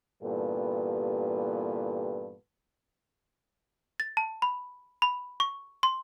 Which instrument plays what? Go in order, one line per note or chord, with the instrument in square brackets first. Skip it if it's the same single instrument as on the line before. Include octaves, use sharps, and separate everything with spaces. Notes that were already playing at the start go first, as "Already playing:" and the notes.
[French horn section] G2 A#2 E3 B3 G4 A4
[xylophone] A6
A5
B5
B5
C#6
C6